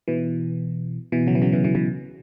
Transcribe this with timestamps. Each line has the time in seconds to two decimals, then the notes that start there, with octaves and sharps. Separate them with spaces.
0.08 B2 E3
1.12 B2 E3
1.27 C#3 F#3
1.35 E3
1.42 C#3 F#3
1.53 B2 E3
1.64 B2 E3
1.75 B2 E3